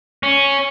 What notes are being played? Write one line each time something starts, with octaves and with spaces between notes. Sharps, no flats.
C#4